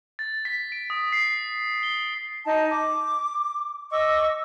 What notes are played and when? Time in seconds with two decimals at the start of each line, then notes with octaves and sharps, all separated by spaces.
0.19 A6
0.45 B6
0.72 D7
0.90 D#6
1.12 C7
1.83 G7
2.45 D#4 A5
2.72 D6
3.90 D#5 C#6 D6 E6